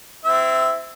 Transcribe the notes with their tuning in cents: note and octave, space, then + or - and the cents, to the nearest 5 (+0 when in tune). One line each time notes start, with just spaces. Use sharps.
C4 -25 E4 +0 E5 +0